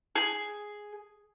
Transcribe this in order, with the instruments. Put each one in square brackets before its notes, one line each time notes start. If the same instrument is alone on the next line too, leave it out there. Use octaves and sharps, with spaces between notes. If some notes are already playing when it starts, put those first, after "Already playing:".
[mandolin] G#4